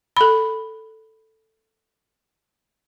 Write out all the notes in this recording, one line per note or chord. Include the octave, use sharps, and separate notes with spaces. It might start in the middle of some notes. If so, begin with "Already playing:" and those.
A4 B5